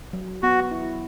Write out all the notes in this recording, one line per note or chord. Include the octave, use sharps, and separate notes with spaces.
F#3
B3 F#4
E4